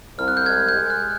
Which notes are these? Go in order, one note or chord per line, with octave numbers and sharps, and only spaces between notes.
C2 F6
F#6
G6
G#3 G#6
G6
G#3
F#6